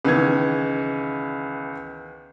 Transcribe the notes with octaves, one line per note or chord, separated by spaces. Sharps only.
C#2 D#3 E3 B3 G#6